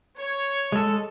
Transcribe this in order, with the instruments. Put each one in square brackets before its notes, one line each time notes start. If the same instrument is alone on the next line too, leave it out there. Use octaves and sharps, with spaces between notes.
[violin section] C#5
[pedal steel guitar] G#3 A4